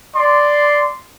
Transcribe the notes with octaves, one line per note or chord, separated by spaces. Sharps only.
D5 C6